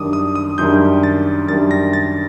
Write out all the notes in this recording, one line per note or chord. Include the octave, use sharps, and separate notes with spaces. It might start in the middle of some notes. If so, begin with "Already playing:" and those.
Already playing: F#2 D#3 G3 D4 D6 D#6
D#6
D#6
F#2 D#3 G3 D4 G6
A6
F#2 D#3 G3 D4 A6
A#6
A6